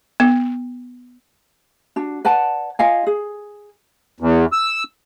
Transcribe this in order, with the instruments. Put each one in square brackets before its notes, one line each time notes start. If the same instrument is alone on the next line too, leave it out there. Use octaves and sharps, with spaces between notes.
[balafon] B3
[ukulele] D4 F#4
B4 D5 F#5 A5
F4 D#5 F5 G#5
G#4
[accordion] E2
E6